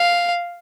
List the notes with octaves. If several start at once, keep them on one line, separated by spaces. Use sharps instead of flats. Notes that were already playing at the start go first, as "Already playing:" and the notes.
Already playing: F5